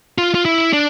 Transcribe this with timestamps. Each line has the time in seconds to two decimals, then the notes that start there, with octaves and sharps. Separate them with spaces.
0.18 F4
0.35 F4
0.45 E4
0.73 D4